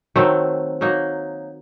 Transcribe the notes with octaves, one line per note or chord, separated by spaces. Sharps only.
D#3 F#3 A3 C4
F#3 A#3 D#4